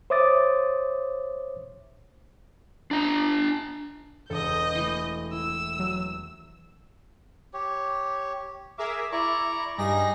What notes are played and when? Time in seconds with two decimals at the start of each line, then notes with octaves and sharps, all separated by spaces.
0.10 C5 C#5 E5 D6 D#6 A6
2.91 D4 A#5
4.30 E1 A4 D#5 G6
4.75 E3 A3
5.32 E4 E6
5.79 F#3
7.54 G4 C#5
8.78 G#4 A#4 E5 D6
9.12 E4 D5 A#5 C#6
9.78 G2 G3 D#4 G#4 A#6